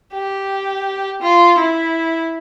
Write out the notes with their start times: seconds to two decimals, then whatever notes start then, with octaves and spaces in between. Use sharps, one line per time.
0.13 G4
1.22 F4
1.58 E4